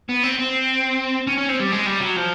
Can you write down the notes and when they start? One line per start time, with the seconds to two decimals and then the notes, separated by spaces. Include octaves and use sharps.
0.09 B3
0.23 C4
0.39 C4
1.27 C#4
1.38 C#4
1.49 C4
1.60 G3
1.72 G#3
1.87 G3
2.01 F#3
2.17 F3